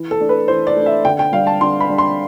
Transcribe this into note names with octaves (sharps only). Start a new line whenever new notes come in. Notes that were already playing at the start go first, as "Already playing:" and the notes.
Already playing: E3
A4
A3 D4
B4
E3 C5
D5
A3 D4
E5
D3 G5
G5
G3 D4 F5
A5
D3 C6
B5
G3 D4
C6